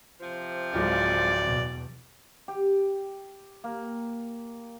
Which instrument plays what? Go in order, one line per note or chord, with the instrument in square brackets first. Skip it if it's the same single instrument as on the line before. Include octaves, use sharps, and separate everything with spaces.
[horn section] C3 F3
[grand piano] D1 F4 [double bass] G#3 [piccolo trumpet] D5
[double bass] E2 B2
[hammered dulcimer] G4
A#3